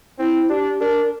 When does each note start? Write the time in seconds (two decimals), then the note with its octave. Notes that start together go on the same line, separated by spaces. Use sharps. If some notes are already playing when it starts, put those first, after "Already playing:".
0.19 C4 E4
0.49 D4 G4
0.81 D4 A#4